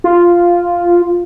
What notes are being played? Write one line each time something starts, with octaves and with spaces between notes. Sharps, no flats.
F4